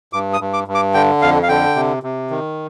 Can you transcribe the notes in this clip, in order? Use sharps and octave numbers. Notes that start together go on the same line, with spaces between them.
G2 D6
D#6
G2
D6
G2
D6
D3 G5
F2 F5
F5
D3 G5
C3
C3
D#3